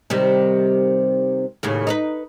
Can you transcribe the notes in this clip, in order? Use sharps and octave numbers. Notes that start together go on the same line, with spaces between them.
C3 D#3 G3
D#2 A2 C#3
D#4 A#4 B4